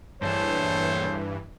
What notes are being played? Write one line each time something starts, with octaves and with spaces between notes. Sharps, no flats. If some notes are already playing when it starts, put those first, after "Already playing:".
G2 A#2 E3 A3 G#4 C5 C#5 A5